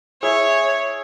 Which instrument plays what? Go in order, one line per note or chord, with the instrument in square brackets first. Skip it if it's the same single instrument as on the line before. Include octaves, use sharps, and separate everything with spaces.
[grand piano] E4 G#4 [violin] C#5